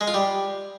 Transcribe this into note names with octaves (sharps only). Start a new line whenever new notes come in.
G#3
F4
G3